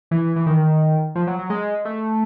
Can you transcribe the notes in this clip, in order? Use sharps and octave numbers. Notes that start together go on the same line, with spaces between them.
E3
E3
D#3
F3
F#3
F#3
G#3
A3